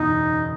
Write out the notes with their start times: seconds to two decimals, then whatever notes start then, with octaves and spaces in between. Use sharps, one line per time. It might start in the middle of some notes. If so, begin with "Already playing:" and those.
Already playing: F#1 E2 B2 D#4